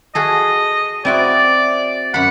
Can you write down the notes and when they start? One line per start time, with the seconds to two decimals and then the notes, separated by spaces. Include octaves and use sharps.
0.15 F#4 G#4 A4 D#5
1.05 C4 E4 F#4 D5
2.14 F#2 F#5 B5